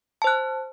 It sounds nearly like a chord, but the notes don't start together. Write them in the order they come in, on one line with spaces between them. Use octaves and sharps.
A5 C5 F#6